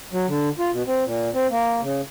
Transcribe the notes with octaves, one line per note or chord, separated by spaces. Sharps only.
F#3
D3
F4
B2
C4
A#2
C4
A#3
C#3